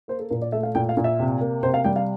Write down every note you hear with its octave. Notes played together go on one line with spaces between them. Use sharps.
A#3 C5
A4
A#2 A#4
D5
A3 E5
F5
A#2 G5
F5
A#2
E5
C3
A#3
C3 C5
F5
G3 G5
F5